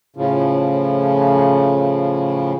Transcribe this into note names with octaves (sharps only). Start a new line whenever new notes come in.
A2 C#3 F3